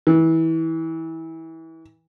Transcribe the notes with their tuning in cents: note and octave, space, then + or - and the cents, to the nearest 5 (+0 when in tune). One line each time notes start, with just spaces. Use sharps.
E3 -25